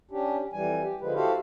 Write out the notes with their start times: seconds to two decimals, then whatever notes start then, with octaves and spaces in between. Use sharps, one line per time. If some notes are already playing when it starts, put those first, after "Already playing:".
0.11 C#4 D4 G4
0.53 F2 E3 G3 G#5
0.83 G4
1.01 D3 F3 G#3 B4
1.14 E4 F#4 G4 A4 C5 F5